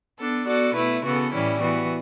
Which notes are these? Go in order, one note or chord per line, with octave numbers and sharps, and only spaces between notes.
B3 D4 A4
B3 F#4 A4 D5
B2 A3 E4 B4
C#3 E3 B3 F#4 A4
A2 E3 G3 C#4 E4
E3 B3 F#4